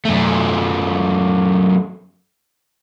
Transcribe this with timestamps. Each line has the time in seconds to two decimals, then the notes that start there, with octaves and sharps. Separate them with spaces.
0.05 F#2 A3